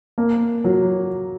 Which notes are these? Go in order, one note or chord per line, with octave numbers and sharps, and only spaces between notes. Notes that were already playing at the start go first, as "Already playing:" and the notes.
A#3
F#3